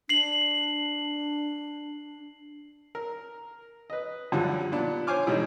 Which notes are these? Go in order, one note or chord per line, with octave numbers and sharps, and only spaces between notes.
D4 C7 F#7
A#4
B4 D#5
F#2 D3 F3 G3
A#2 B3 D4
C5 C#5 G#5 D6 F6
B2 E3 G3 G#3 C#4 D#4